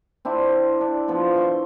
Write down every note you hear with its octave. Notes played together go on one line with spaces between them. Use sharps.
C4 D4 E4
D4
F3 B3 F4
E4 C6 C#6